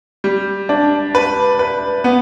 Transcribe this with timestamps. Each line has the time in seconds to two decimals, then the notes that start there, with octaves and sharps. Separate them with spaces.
0.24 G3
0.69 D4
1.15 B4
1.59 B4
2.04 B3